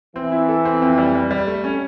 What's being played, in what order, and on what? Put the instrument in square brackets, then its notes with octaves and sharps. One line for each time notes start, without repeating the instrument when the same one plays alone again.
[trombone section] E3 [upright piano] C4
[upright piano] E4
A4
C4
F2
G3
G3
G3
A3
C#4